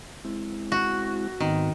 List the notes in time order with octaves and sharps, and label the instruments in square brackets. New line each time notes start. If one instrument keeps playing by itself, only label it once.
[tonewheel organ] G#3 C4 E4
[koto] F#4
[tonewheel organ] G#2 B3 C4 [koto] D#3